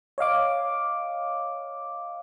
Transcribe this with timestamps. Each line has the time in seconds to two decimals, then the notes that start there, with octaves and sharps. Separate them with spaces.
0.18 C#5 D#5 F5 D6